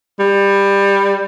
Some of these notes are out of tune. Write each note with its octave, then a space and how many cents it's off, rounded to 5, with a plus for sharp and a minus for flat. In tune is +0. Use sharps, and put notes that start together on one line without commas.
G3 +20